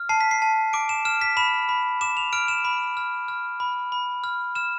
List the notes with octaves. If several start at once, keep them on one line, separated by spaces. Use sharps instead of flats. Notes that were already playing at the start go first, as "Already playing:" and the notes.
Already playing: F6
A5 C7
B6
C7
A5
D6 D7
E7
F6 E7
B6
B5 E7
B5
D6 E7
F7
F6 D7
E7
B5
F6
F6
B5
B5
F6
F6 E7